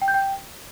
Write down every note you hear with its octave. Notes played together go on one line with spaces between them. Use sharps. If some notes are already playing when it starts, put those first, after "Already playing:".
G5
G6
G5